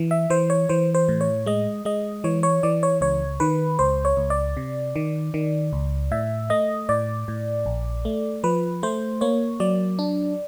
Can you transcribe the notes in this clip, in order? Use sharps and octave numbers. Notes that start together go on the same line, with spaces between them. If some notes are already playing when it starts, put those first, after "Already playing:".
Already playing: E3
E5
E3 C5
C#5
E3 C5
C5
A2
C#5
G#3 D#5
G#3 D#5
E3 C#5
C#5
E3 D5
C#5
C#2 C#5
D#3 B4
C#2 C5
C#5
C#2
D5
C3
D#3
D#3
C#2
A2 E5
A3 D#5
A2 D5
A2
A#1
A3
F3 B4
A3 C5
A#3 C#5
F#3 D5
D4